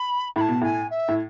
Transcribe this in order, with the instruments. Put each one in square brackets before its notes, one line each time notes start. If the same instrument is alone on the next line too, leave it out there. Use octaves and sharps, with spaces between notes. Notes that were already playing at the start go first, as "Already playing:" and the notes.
Already playing: [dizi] B5
[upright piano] A2 [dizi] B5
[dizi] A5
[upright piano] B2
[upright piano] A2 [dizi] G#5
[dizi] E5
[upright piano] A2